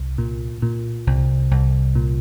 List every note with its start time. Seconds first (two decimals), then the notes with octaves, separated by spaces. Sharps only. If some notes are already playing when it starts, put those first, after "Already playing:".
Already playing: C2
0.18 A#2
0.62 A#2
1.07 C2
1.51 C2
1.95 A#2